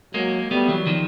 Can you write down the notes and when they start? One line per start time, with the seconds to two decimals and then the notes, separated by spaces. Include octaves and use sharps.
0.14 F#3 G#3 A#3
0.50 G3 A3 B3
0.68 E3 F#3
0.86 D#3 F3